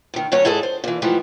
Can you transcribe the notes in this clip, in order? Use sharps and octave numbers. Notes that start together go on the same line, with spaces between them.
D2 D#3
D2 F#3 C#4 C#5
G#2 E4 G#4 A4 A5
C5
A#2 E3
G#2 E3 F3 A3 G4